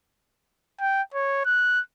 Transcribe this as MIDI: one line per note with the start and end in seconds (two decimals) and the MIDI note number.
0.80 1.02 79
1.14 1.44 73
1.46 1.81 90